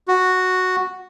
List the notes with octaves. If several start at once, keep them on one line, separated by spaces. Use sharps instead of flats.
F#4